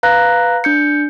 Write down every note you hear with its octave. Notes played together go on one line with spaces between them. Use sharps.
B4 F5 A#5 F#6 A#6
D4 G6 C#7